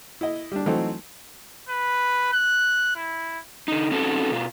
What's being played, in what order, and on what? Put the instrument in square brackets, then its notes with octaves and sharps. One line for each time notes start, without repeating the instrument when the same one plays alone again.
[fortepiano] E4 D#5
G3 D4
E3 F#3 A3 C4 D#4
[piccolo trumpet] B4
F#6
E4
[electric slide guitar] D3 D#4
C4 C#4 D#4 F#4 A4
B2 F4